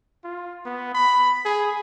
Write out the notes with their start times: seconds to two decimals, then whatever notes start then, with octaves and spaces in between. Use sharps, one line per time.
0.24 F4
0.65 B3
0.95 B5
1.45 G#4